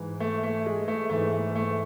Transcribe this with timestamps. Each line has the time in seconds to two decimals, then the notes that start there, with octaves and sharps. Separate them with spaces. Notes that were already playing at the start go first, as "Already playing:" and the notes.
Already playing: G#2 E3
0.20 A3
0.43 A3
0.66 G#3
0.88 A3
1.10 G#2 E3 A3
1.32 A3
1.55 A3